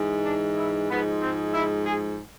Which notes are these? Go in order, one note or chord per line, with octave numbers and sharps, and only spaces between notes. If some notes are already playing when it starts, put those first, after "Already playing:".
Already playing: G#2 E3 G#3
D4
E4
G#2 F3 G#3 B3
C4
E4
G#4